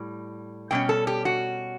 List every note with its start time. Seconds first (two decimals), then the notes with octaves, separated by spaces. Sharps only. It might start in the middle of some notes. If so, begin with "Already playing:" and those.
Already playing: A2 G3
0.71 B2 G3 C#4 G5
0.89 A4
1.07 G4
1.25 F#4